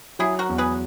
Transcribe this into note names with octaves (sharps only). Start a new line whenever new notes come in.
F#3 E4 G#4
F#4 A#4
E2
G#4 B4